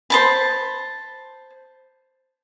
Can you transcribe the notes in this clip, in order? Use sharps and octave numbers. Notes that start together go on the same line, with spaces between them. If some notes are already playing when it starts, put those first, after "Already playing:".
C5 A5 B5